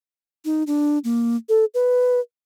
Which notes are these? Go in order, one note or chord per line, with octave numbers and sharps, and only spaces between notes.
D#4
D4
A#3
A4
B4